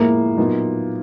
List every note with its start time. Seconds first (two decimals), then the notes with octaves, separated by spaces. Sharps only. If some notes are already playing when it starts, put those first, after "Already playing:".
Already playing: A2 F3 G#3 A#3
0.37 A#2 F#3 B3 D#4